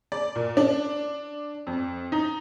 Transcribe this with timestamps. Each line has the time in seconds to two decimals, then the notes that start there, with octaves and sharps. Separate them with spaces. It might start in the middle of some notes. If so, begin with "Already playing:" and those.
0.12 D5
0.35 A#2
0.57 D4
1.67 F2
2.12 D#4